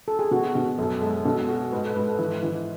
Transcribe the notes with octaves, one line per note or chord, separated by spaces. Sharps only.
A4
G#4
B2 F#4
B2
F#2 A4
G#3 A4
B2 A4
F#4 A4
G#2 B4
A4
G#2 B4
A4
E3
E3